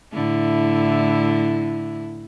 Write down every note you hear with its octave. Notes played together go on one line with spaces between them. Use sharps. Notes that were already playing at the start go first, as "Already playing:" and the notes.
A2 D3 E4